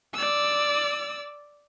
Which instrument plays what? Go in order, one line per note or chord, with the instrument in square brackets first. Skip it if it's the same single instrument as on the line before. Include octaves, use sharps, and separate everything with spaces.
[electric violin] D5 E6